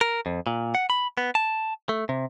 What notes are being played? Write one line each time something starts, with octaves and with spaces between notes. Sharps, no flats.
A#4
F2
A#2
F#5
B5
B3
A5
A3
C3